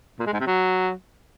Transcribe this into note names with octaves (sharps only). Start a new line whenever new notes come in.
A#2
G#3
G#2
C3
F#3